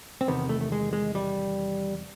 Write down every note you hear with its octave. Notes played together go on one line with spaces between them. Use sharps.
C4
E2 C3 D#3 B3
A3
A3
G#3
G#3
G3